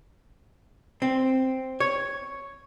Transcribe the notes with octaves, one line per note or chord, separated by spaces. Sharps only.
C4
C#5